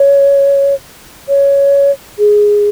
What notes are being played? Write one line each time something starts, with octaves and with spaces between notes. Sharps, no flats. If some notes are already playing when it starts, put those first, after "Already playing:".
Already playing: C#5
C#5
G#4